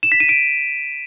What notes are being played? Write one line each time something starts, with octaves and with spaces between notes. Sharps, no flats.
E7
B6
D#7
D7